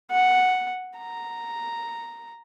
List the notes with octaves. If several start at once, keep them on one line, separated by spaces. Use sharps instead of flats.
F#5
A#5